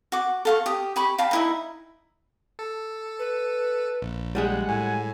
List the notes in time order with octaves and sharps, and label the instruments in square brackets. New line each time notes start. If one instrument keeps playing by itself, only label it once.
[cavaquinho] F#4 D6
A4 F5 C#6
G4 D#6
G4 B5 C#6
F5 G5 A5 B5
D#4 E4 E5
[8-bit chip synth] A4
[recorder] B4
[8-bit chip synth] A#1
[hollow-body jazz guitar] G3 G#3 G#4 [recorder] F#5
[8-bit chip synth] A2 [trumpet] G#5